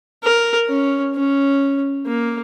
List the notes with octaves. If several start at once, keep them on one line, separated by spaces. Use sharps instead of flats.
A#4
C#4
C#4
A#3